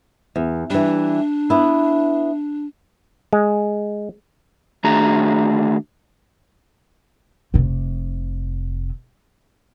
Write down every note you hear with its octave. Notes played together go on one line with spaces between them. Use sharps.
E2
E3 G3 D4
B3 E4
G#3
D#3 A3 D4 F#4 G#4 A#5
F1 C3